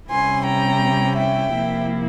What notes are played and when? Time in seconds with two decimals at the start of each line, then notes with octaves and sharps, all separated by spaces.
0.10 C3 G3 C#4 E4 G#5 C6
0.46 G5 A#5
1.17 E5 G5
1.54 C3 F3 A#3 E4